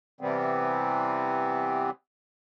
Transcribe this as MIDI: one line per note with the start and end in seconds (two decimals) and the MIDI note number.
0.21 1.90 48
0.21 1.90 52
0.21 1.90 55
0.21 1.90 59
0.21 1.90 60